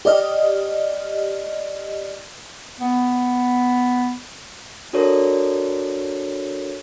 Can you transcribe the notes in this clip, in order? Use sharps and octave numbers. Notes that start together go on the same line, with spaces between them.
G4 D5 D#5 F6
B3
D4 F#4 A4 A#4 C#5 D5